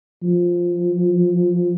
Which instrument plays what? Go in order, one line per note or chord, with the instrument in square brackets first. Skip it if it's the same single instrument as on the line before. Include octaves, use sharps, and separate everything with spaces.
[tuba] F3